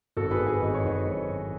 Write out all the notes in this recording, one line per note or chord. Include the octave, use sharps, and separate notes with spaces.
G#1 F#4 A4
G#4 B4
G#1
G#4 B4
G#1 D#5
C#5
G#1 B4 D#5
F#2
G#1